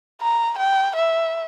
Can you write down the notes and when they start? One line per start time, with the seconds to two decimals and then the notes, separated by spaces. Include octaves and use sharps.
0.21 A#5
0.58 G5
0.96 E5